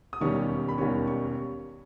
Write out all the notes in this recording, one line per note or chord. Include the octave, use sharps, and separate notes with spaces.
D#6
E1 D#2 D#3 G3 C#4 C#6
B5
E1 D#2 D#3 G3 C#4 C#6
C#6